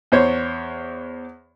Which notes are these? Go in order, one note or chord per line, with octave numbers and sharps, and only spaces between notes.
E2 C5 C#5